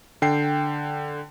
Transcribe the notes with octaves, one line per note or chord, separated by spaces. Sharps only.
D3 G5 C7